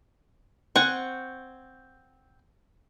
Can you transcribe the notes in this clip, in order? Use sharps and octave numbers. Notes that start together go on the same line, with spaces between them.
C4 F#5 G#5 C#6